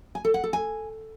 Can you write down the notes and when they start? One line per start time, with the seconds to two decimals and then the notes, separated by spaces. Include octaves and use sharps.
0.15 G#5
0.25 A4
0.34 F#5
0.44 A4
0.53 G#5